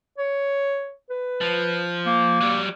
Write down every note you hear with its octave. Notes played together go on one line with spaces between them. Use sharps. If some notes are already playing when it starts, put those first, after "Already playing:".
C#5
B4
F3
A#3
F#3 G3